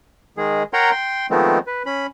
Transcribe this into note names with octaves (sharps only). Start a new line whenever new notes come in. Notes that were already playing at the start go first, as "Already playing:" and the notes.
D#3 G#3 G#4
A#4 C#5 F#5 G5 A#5 C6
G5 C6
D#3 F3 G#3 A3 B3 C4
B4
C#4 B5